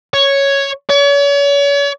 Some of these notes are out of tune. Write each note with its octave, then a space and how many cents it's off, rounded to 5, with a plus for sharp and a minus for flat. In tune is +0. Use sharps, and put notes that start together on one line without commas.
C#5 +0
C#5 +40